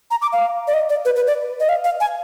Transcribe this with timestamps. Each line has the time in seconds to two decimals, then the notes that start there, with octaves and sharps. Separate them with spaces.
0.11 A#5
0.22 D6
0.33 F5
0.67 D5
0.74 D#5
0.89 D5
1.05 B4
1.16 B4
1.27 D5
1.60 D#5
1.69 F5
1.84 F5
2.01 G#5